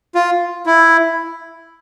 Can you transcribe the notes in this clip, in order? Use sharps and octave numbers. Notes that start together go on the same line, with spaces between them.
F4
E4